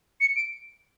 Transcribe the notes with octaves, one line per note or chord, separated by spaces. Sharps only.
C#7
D7